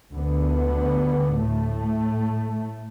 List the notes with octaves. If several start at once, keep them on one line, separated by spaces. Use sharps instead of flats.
D2 D3 B3
A2 A3